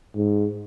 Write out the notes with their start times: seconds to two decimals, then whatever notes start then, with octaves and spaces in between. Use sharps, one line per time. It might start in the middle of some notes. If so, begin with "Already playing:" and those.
0.15 G#2